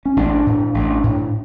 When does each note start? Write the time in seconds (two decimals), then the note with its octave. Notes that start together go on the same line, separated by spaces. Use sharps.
0.05 C#4
0.17 A1 D4
0.46 A2
0.74 A1
1.04 A2